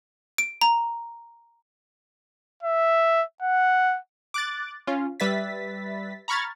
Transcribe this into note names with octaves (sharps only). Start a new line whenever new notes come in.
D7
A#5
E5
F#5
D6 F#6 A6
C#4 F4
G3 B4 E5 A6 B6
A#5 B5 C#6 F6 G#6 A6